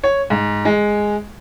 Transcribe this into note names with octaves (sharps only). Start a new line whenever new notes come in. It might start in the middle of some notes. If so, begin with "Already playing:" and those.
C#5
G#2
G#3